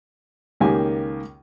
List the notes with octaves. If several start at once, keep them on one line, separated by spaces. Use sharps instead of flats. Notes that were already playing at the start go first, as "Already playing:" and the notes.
C#2 D#3 A#3 G4 G#5